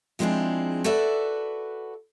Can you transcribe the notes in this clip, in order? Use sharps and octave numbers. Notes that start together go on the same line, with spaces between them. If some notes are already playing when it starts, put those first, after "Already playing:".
F3 G#3 C4 D4 E4 G#4
F#4 A4 B4 D5 E5